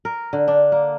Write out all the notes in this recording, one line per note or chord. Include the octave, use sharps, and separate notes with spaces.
A#4
D3
D4
A#3